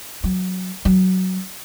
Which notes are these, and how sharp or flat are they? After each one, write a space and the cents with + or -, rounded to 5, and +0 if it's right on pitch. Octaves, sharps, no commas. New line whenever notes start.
F#3 -5
F#3 +10